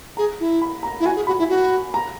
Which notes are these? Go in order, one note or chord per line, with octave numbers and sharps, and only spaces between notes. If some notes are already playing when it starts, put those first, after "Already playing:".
G#4 A#5
E4
B5
A#5
E4
F#4 G#5
G#4
F#4 B5
E4
F#4
A#5